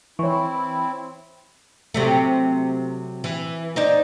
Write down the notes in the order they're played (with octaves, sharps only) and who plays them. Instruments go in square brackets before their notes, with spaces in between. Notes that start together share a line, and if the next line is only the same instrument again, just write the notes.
[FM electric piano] E3 [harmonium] C4 E4 [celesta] C#5 E5 C#6
[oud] C3 F#3 A3
E3
D#4 C5 D5